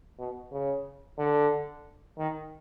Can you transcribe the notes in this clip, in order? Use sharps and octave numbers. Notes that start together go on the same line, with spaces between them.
B2
C#3
D3
D#3